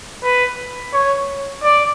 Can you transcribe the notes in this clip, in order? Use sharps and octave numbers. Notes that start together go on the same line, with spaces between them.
B4
C#5
D5